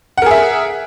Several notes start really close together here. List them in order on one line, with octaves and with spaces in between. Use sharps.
F#5 A#4 G#4 E5